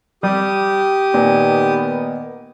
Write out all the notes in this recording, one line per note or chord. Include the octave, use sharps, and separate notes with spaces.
G3 G4 D#6
A#2 D#3 B3